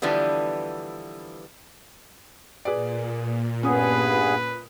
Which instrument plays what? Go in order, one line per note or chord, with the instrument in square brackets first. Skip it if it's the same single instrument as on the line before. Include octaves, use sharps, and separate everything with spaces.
[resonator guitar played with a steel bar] D3 E3 F3 G3 B3
[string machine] A#2 [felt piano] G#4 B4 D5
[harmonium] G2 B3 G#4 [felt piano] C#4 D#6 [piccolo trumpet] B4